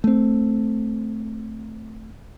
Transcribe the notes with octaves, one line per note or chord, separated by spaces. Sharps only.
A3 C4